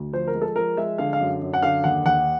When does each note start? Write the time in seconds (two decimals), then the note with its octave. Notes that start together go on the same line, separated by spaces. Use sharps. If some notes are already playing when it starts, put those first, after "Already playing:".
Already playing: D2
0.13 F3 C5
0.27 A#4
0.35 G#3
0.42 A4
0.56 F3 A#4
0.77 G#3 E5
0.98 D3 F5
1.13 F5
1.20 F#2
1.42 F#2
1.54 F#5
1.62 D3 F5
1.84 D#2 F#5
2.06 D#2 F#5